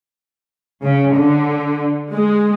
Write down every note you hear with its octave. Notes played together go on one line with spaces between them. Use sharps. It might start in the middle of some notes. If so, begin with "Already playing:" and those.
C#3
D3
G#3